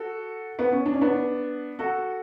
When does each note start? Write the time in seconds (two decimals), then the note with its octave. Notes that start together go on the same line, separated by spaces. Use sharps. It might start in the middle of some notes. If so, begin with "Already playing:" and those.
Already playing: F#4 A4
0.59 B3
0.72 C#4
0.86 D4
0.94 C#4
1.01 B3 D4
1.79 F#4 A4